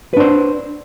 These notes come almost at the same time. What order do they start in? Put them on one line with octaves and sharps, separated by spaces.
B4 D4 C5